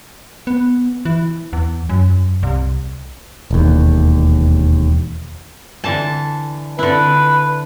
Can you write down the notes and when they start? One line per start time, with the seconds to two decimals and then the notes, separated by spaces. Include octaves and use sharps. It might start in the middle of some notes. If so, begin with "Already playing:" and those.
0.47 B3
1.05 E3
1.53 E2
1.89 F#2
2.43 C2
3.51 E1 D#2
5.84 D3 E3 A5
6.79 D3 E4 B4